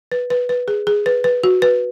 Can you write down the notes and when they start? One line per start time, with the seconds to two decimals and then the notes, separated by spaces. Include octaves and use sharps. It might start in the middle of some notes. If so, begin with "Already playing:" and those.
0.12 B4
0.30 B4
0.49 B4
0.68 G#4
0.87 G#4
1.06 B4
1.24 B4
1.44 F#4
1.62 B4